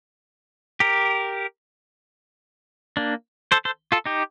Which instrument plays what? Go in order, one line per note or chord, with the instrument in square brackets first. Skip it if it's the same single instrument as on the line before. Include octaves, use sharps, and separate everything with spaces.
[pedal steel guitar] G4 A#4
A#3 D4
A4 C5
A4 C5
F4 A4
D#4 G4